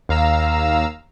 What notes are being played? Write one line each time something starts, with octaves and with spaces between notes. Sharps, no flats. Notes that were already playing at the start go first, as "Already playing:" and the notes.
D#2 F5 A#5 E6